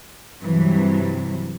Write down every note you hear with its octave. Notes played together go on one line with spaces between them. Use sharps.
G2 C3 E3 F#3